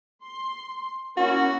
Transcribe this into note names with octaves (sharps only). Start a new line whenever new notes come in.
C6
A#3 C#4 E4 F#4